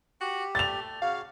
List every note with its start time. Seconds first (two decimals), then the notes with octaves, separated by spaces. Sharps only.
0.21 F#4 G4
0.55 A3 A6 F7
1.02 C#3 F#4 F5